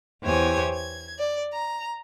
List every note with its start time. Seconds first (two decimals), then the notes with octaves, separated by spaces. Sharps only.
0.24 E2 G4 C5 C#5 G#5 G#6
0.74 G#6
1.18 D5
1.52 A#5